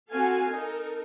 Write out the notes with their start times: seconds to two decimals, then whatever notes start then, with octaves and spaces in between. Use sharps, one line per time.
0.11 C4 F#4 A4 F5 G#5
0.51 D#4 A4 A#4